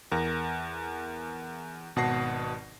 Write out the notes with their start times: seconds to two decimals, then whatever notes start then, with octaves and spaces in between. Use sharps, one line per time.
0.11 E2 A#4 A#6
1.96 G#1 B2 F#5 A5 A#6 C7